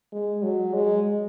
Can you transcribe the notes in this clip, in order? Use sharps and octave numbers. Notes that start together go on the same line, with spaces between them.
G#3
F#3
G#3